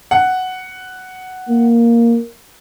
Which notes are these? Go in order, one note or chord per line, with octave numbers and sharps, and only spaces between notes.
F#5
A#3